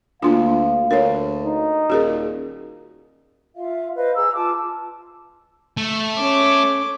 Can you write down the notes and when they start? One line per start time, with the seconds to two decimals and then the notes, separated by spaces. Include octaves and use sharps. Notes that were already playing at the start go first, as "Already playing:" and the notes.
0.22 D2 A#3 D4 F4 F5
0.91 D2 A#4 C#5
1.46 D#4
1.90 D#1 F#4 G#4 A#4
3.55 F4 E5 F5
3.96 B4 C5 D#5 F5
4.15 G#4 A#5 E6
4.35 F4 A5 D6
5.77 A3
6.17 C#4 D6